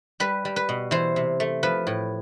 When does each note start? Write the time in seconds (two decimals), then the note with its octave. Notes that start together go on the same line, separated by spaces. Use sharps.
0.20 G3 B4
0.45 G3
0.56 B4
0.69 B2
0.91 E3 C5
1.16 C3
1.40 A3
1.63 F3 B4
1.87 A2